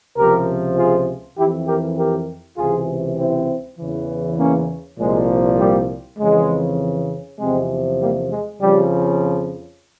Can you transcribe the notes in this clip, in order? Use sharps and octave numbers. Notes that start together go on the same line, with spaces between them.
C#2 C3 F3 G4 A#4
F4 G#4
F2 E3 E4 G4
G4 A#4
G4 A#4
C#2 C3 E3 F4 G#4
C4 E4
E2 C#3 E3
A#3 C#4
C2 A#2 F3 G#3
G3 A#3
F2 C#3 E3 G#3
E2 C3 F3 G#3 C4
G3 A#3
G#3
F2 C#3 F3 G3